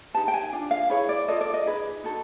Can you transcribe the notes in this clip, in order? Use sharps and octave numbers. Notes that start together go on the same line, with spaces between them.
D#4 G4 B4 A5
G5
G#5
D4 F4
F5
E4 G#4 B4 C#5
D5
F4 A4 D#5
D5
D#5
D#4 G#4 B4
D#4 F#4 A4